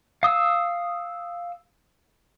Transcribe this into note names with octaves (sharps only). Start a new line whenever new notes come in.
F5 D#6 E6